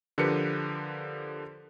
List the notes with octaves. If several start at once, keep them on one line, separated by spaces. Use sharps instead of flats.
D3 F3 G4 A#4 B4 C#7